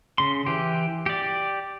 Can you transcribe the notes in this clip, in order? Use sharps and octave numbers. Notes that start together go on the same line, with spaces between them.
C#3 C6
E3 G4
G4 D5